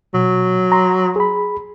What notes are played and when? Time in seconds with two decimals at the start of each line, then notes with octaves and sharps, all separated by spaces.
0.14 B2 F#3
0.72 A#5 C6
1.16 G#4 B5